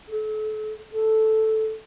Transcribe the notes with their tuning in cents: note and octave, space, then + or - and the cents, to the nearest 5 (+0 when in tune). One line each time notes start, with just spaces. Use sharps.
A4 -35
A4 -5